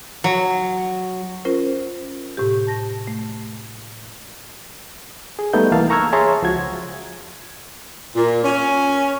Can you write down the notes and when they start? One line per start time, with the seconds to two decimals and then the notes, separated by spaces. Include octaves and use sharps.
0.24 F#3
1.45 C#4 F4 A#4 C5
2.37 A2 C3 G4
2.67 A5 A#6
3.08 A3
5.39 G#4
5.53 G3 A3 B3 D#4 G6
5.72 C2 E3 A#3 E4 F5 A5
5.90 A#5 C#6 E6 F6 G#6
6.13 G#4 C#5 E5 A5 A#5 C6
6.42 C#2 F3 F#4 G#6
8.16 A#2
8.44 C#4